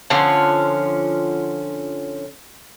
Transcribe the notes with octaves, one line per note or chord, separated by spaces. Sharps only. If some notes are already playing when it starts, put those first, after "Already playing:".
D3 F3 C#4